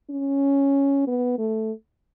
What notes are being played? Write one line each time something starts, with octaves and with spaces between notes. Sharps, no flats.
C#4
B3
A3